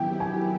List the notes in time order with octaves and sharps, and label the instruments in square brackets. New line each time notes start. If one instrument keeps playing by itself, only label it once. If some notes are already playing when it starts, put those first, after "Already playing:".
Already playing: [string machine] D#3 F#3 B3 E4 G4 [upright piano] G5
[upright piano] G#5